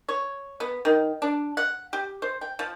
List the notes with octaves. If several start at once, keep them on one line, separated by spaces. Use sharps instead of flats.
C#5
B3
D#3
D4
F#5
G4
C5
G5
F3